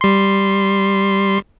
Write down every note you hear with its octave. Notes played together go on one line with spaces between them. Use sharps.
G3 C6